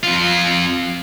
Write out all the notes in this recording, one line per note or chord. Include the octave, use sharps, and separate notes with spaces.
F2 F4